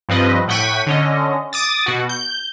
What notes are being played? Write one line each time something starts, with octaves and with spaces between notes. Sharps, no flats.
G2 F3 C4 B4 D#5
A2 F#5 G5 C#6 B6 D#7
D3 C#4 D#5
D6 D#6 A6
B2 F#4
G6